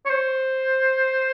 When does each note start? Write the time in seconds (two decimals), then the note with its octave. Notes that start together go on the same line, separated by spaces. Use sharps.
0.05 C#5
0.09 C5